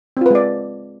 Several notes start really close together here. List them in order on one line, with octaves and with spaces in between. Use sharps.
C4 F4 B4 G#3 D5